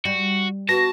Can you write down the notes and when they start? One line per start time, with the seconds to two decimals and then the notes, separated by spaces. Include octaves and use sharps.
0.05 G3 F#4
0.69 B3 F#4 A5 A#6